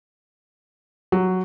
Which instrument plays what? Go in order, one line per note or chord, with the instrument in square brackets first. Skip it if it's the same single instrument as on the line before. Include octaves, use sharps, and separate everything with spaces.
[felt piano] F#3